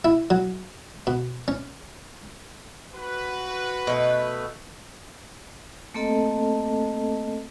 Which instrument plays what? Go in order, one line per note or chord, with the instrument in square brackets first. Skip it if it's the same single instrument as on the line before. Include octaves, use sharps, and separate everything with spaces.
[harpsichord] E4
F#3
B2
C#4
[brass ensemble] F#4 B4
[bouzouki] B2 A3
[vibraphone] A3 A#3 C4 A4 D#5 A5